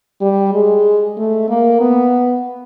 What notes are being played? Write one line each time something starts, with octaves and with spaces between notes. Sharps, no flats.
G3
G#3
A3
A#3
B3